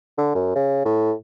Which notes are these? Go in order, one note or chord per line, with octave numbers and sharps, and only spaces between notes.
D3
F#2
C#3
A2